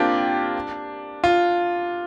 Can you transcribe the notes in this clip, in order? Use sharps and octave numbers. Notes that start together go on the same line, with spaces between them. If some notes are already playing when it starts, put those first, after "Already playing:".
Already playing: A#3 C4 D4 F4 G4
F4